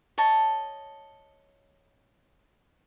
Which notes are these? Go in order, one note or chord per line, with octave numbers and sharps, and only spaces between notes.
C#5 D#5 A5